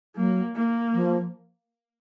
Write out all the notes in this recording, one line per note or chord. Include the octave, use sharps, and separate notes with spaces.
F#3 A#3
A#3
F3